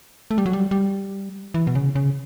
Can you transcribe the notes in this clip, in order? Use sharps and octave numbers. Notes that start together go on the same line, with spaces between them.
A3
G3
F#3
G3
G3
E3
B2
C#3
C#3